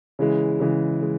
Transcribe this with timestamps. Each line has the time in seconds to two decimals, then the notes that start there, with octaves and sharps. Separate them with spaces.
0.19 C#3 E3 G#3
0.60 C#3 E3 G#3
1.02 G#3